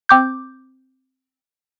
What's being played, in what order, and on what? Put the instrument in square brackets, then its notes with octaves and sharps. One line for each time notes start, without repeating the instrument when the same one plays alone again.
[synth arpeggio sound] C4 D6 G6